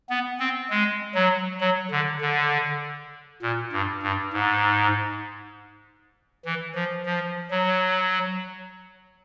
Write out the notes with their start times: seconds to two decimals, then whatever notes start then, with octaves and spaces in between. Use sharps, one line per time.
0.10 B3
0.40 C4
0.70 G#3
1.15 F#3
1.61 F#3
1.91 D3
2.21 D3
3.42 A#2
3.72 G2
4.02 G2
4.33 G#2
6.45 E3
6.75 F3
7.06 F3
7.51 F#3